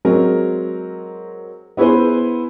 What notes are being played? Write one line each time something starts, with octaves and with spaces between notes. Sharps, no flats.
F#3 G#3 C4 G#4 A#4
B3 E4 G#4 B4 C5